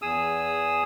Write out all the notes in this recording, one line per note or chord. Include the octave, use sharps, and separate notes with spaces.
E2 G#4 D#6 E6